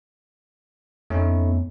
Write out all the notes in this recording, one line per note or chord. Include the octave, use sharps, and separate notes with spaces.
F2 A3 B3 C#4 D#4 C#5